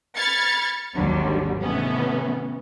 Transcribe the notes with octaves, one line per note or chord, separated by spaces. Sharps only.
B5 F6 G#6 A6 C#7
G#1 D#2 D3 F#3 G3
C3 D#3 E3 A3 B3 C#4